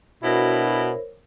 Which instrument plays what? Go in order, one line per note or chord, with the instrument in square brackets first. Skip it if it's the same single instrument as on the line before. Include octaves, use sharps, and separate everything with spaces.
[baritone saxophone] B2 [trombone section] D4 F#4 [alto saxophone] E4 [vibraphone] A#4 C5 C#5